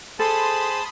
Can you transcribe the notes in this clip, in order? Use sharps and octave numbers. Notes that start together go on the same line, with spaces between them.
G#4 A4 C5 A5 B5 C6 D#6